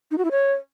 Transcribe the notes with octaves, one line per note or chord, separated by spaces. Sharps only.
D#4
F#4
E4
C#5